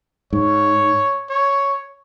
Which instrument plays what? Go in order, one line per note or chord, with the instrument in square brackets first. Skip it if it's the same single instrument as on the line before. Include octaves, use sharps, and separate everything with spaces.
[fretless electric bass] G#2 [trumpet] C#5
[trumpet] C#5